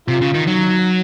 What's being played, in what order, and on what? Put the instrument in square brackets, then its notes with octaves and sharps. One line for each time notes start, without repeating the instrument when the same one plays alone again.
[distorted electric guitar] C3 [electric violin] F4
[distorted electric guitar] C#3
D#3
[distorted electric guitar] F#3 [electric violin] D#4